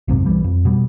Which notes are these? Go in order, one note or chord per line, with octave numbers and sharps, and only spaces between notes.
B1 F2 G#2 C3
B1 E3 G3
F2
B2 G3